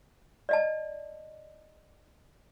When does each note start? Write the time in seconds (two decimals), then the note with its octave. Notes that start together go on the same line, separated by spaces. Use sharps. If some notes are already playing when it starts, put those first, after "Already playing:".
0.49 D5 D#5 A5